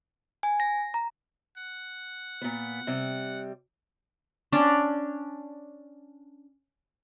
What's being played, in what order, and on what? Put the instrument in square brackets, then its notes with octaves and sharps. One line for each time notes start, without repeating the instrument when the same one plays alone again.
[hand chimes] G#5
A#6
A#5
[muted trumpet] F#5
[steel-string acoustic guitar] A#2 B3
C3 G3
[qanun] C#4 D4 D5